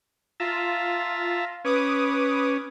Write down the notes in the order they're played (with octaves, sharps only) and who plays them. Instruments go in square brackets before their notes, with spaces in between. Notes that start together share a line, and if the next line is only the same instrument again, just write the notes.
[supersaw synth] F4 [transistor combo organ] E5 A5 A#5
[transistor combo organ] C#4 [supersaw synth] B4 D6 D#6